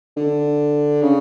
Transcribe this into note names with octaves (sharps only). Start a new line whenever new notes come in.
D3
C#3